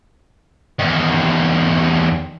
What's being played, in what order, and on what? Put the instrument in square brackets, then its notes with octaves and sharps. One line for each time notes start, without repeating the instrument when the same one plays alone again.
[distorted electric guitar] E2 D#3